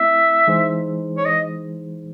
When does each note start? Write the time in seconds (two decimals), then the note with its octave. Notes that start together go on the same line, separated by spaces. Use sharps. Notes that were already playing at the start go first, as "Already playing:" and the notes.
Already playing: A3 C4 E4 E5
0.47 E3 G#3 D#4 G#4 C5
1.17 C#5
1.25 D#5